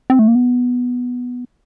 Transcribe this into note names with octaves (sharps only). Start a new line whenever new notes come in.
C4
A3
A#3
B3